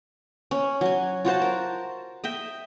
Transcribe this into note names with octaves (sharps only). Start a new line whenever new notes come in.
C#4
F#3 G#5
F4 F#4 C5 A5
A#4
D#5 E5 G5